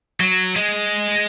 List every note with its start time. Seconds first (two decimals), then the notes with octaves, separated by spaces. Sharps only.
0.20 F#3
0.56 G#3